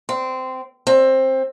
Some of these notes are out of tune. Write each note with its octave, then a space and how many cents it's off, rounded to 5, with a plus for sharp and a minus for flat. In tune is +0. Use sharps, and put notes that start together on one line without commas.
C4 -15
C4 +15